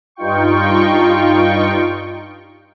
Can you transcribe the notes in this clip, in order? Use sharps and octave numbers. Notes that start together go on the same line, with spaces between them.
G2 D#4 F4 G5 C#6